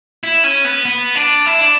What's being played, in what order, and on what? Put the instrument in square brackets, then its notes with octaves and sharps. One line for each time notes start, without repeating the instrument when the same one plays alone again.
[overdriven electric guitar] E4
C#4
B3
B3
D4
E4
D4